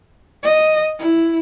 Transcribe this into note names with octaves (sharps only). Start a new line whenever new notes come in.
D#5
E4